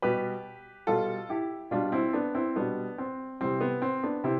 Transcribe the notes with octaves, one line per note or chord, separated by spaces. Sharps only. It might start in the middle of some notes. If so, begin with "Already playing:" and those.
B2 G3 G4 B4
B2 G3 F4 A4
E4 G4
B2 G3 D4 F4
C4 E4
B3 D4
C4 E4
B2 G3 B3 D4
C4
C3 E3 G3 C4
B3
C4
B3 D4
C3 C4 E4